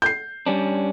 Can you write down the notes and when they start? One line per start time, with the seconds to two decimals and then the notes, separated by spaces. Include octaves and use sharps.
0.02 G6 C7
0.46 G3 C#4 D4